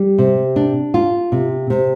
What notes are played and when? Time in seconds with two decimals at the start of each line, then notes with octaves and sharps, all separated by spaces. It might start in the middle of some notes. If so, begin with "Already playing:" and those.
Already playing: G3
0.18 C3
0.56 D4
0.94 F4
1.32 C3
1.70 C3